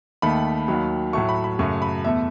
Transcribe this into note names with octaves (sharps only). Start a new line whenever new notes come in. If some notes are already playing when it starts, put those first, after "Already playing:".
D#2 D#3 A3 B5
D#2 D#3 F#3
A2 F#3 A3 C#6
B5
B5
F#2 C#3 F#3 A3 C#6
B5
E2 B2 A3 E5